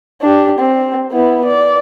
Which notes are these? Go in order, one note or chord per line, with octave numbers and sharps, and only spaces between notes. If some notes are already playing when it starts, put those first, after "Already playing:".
D4 G4
C4
B3 E4
D5